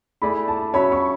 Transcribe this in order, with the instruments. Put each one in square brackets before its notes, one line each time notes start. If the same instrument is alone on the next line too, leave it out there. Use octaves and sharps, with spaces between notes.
[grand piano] A3 E4 G#4 D5 [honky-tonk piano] B5
[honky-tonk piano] A5
[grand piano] F#3 C#4 F#4 C#5 E5 [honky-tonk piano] B5
[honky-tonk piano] C#6